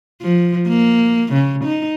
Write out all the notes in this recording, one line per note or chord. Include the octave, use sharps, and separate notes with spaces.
F3
A#3
C#3
D#4